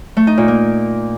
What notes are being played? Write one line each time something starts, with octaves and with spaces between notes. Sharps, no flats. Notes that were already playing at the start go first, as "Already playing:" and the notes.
A3
D#4
A#2
A#3